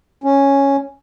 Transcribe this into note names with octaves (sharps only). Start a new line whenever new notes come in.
C#4